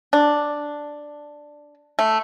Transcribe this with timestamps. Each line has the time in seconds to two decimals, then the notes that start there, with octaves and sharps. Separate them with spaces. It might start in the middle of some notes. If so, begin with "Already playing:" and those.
0.13 D4
1.99 A3